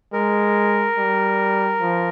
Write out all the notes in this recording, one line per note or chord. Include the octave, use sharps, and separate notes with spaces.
G#3 A#4
G3
F3